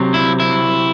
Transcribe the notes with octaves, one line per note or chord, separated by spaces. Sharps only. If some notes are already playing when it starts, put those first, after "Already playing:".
Already playing: C3 F#3 C4
E4
E4